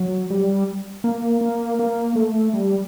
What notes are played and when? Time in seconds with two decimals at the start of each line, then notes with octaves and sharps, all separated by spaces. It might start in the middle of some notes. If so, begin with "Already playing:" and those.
Already playing: F#3
0.30 G3
1.04 A#3
1.41 A#3
1.79 A#3
2.16 A3
2.54 G3